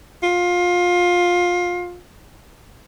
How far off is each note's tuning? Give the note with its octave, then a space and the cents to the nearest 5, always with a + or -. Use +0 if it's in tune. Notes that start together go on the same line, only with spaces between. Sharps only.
F4 +20